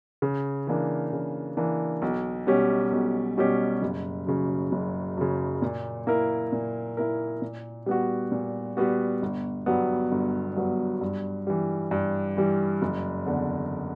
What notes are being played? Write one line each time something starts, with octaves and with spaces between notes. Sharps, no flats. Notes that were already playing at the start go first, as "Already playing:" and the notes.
C#3
E3 A#3 D4
C#3
E3 A#3 D4
B1
B2 G3 C#4 G4
B1
B2 G3 C#4 G4
F#1
F#2 C#3
F#1
F#2 C#3
A#2
A#3 E4 A#4
A#2
A#3 E4 A#4
A#2
G3 B3 F#4
A#2
G3 B3 F#4
G1
G2 F#3 B3
G1
G2 F#3 B3
G2
E3 G3
G2
E3 G3
F#1
E2 D3